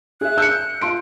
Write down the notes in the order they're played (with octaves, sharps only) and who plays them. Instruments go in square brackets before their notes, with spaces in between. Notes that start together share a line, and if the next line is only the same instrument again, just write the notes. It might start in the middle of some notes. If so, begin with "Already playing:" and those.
[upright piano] G#4 E5 [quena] F#6
[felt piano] E6 [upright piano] G6 C#7
[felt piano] F4 C6 D7